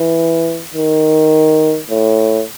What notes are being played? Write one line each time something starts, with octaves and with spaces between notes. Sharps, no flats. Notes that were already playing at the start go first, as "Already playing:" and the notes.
Already playing: E3
D#3
A2